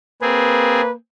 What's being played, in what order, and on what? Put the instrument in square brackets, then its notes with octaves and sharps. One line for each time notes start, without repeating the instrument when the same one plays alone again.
[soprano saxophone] A#3 [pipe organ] C4 G#4 [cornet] B4